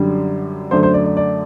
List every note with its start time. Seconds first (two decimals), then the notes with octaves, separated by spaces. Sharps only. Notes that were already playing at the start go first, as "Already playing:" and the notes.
Already playing: F#2 D3 G3
0.71 F#2 D3 A3 C5
0.83 C5
0.94 D5
1.05 D5
1.17 D5